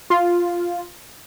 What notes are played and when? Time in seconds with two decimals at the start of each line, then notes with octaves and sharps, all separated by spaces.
0.10 F4